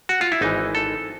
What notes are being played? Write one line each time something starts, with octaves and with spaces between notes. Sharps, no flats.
F#4
F4
E4
G#1 G#2 E3 D#4
A4